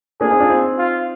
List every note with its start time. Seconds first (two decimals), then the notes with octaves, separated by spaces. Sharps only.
0.21 A#3 D4 G#4
0.30 C4 D#4
0.40 D4 F4
0.50 C4 D#4
0.79 F4